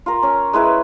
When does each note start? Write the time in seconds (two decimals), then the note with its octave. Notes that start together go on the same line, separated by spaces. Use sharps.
0.06 F4 A#4
0.23 C#4
0.53 G#3 E4 B4